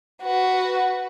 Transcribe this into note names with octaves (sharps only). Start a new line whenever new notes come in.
F#4 B4